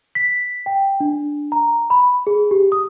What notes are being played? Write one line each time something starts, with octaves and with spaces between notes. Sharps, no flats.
B6
G5
D4
A#5
B5
G#4
G4
D#6